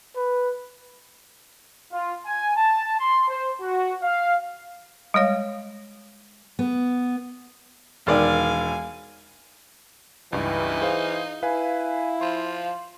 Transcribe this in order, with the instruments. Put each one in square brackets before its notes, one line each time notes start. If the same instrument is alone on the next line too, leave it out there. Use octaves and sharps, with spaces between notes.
[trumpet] B4
[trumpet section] F4
G#5
A5
C6
C5
F#4
F5
[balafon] G3 G#3 C#5 F5
[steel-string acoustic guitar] B3
[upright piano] E1 D#3 D5 [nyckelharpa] F5 G#5
[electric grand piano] C#2 G2 [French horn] E3 [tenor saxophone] D#4
[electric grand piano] G#4 C5 F5
[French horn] E4 [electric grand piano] B4 G#5 [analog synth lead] F5
[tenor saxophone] F3 [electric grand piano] C6